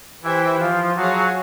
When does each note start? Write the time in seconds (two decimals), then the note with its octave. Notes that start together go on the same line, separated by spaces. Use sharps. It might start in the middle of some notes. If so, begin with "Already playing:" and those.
0.23 E3 E4 G4 C5 E5 G5
0.60 F3 F4
0.96 F#3 F#4 G#4 C#5 F5 A5